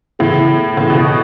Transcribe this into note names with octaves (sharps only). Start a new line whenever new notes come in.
A2 C#3 E3 B3 E4 G#4
A2 C#3 E3 B3 E4 G#4
B2
A2